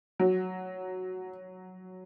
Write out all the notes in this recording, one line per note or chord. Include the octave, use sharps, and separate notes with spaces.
F#3